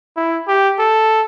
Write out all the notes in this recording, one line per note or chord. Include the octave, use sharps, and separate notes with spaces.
E4
G4
A4